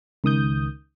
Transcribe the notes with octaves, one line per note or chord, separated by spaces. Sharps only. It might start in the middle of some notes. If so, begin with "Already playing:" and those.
C#2 D#3 D#6 G6